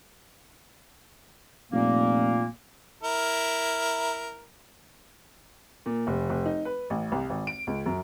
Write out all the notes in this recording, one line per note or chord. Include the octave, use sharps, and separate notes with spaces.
F1 A#2 A#3
E4 A#4
A#2
F1
F1
D#4
B4
A1
C2
G#1
D7
C#2
F#2